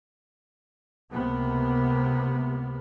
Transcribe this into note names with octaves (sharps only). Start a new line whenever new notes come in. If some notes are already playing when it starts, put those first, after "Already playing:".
C#2 C3 A#3 B3